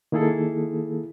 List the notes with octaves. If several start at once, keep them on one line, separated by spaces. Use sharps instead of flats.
D#3 A#3 E4 G#4 A4